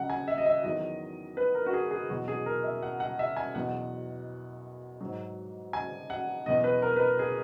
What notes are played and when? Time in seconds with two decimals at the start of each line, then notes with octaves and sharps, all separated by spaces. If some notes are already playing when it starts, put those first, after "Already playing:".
Already playing: C#3 F#3 F#5
0.10 G#5
0.28 E5
0.38 D#5
0.46 E5
0.64 E2 D#3 F#3 D#5
1.37 B4
1.55 A#4
1.66 F#4
1.73 G#4
1.91 G#4
2.09 E2 B2 F#3 F#4
2.28 G#4
2.46 A#4
2.64 E5
2.83 F#5
3.00 F#5
3.19 E5
3.37 G#5
3.55 E2 B2 F#3 F#5
5.00 G#2 F#3
5.73 G#5
6.10 F#5
6.46 E2 B2 F#3 D#5
6.64 B4
6.82 A#4
6.96 B4
7.00 A#4
7.19 G#4